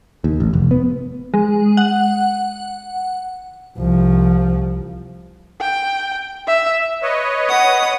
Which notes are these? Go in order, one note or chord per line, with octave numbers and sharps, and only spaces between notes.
D#2
A1
F1
B3
G#3
F#5
C2 F3
G5
E5
B4 C#5 D#5
F#5 D#6